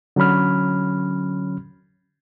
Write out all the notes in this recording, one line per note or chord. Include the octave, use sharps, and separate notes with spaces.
D3 F#3 C#4 B5 F6